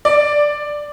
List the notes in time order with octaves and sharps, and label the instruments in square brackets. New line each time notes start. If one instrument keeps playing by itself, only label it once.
[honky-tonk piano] D5